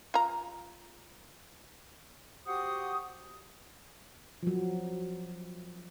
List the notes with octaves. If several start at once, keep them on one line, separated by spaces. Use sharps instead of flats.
F4 A#5
F#4 G4 C5 F#5 D#6
F3 F#3